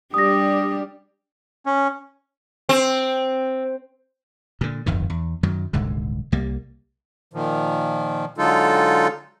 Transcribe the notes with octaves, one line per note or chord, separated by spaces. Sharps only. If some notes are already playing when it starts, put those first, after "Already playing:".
G3 D4 G4 D#6 A#6
C#4
C4
A#2 D3
D1 G1 F2 D#3
E2
F#2 D#3 F#3
D#1 C2 G#2 D3
C2 G3 A#3
A#2 D#3 F3
D3 F#3 G#3 D#4 F4 A4